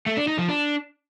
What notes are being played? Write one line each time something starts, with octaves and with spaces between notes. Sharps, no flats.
A3
D4
D#4
F3
D4